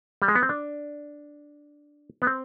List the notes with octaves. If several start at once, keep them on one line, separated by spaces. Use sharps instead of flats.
G3
G#3
B3
C4
D4
B3
C4